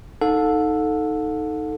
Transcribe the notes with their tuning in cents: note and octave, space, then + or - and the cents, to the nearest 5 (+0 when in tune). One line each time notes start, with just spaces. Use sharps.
D#4 +0 A4 +0 F#5 -45